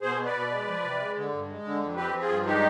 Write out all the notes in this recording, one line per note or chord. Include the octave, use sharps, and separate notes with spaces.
B2 G#4 C5
B3
B4 D5
B2
G#3
F3
C3
G#3
D3
G2
G#3
D3
F2
C4 G4 B4
F3
F4 G#4
G2
G#3 D#4 G4